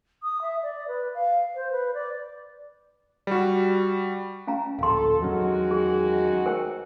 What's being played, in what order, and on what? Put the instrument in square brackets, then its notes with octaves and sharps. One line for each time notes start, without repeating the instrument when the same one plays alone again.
[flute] D#6
E5
D5
B4
F5
C5
B4
D5
[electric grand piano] G3 F#4
[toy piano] C#4 F5 A#5
[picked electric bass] D1 A#1 [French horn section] A4 [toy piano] F5 C6
[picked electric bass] E2 F#3 C#4 [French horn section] D#3 G#3 F#4
[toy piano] G#4
A#4 C5 G5